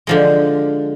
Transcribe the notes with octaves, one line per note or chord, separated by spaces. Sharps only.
D3 F3 G#3